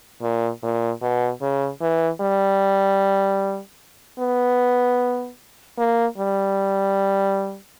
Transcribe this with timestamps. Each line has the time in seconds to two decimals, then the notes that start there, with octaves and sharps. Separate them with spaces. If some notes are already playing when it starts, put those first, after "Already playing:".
0.22 A#2
0.63 A#2
1.02 B2
1.41 C#3
1.81 E3
2.21 G3
4.19 B3
5.78 A#3
6.18 G3